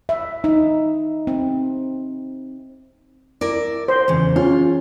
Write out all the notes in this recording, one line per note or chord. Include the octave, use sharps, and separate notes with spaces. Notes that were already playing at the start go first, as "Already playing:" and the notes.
E5
D#4
C4
E4 A#4 D5
C5
E2 C#3
C#4 F4